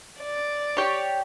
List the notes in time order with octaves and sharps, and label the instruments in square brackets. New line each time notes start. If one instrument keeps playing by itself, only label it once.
[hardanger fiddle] D5
[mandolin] G4 C#5